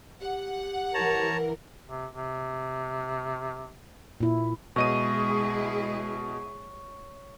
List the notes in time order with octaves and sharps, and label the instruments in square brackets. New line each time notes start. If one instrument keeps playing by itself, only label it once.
[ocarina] G4 [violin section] F#5
[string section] E3 A#4 [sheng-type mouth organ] C#5 A5 A#5
[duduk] C3
C3
[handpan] A#2 E4
[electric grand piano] B2 D#5 D#7 [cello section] G#3 E4 G#4 [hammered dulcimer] C#5